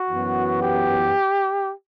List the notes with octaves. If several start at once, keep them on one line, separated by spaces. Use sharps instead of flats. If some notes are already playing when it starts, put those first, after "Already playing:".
Already playing: F#4
F#2 E3 B3
G4